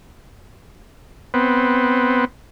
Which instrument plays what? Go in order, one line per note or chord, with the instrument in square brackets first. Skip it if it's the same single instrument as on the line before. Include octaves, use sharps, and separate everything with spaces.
[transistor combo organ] B3 C4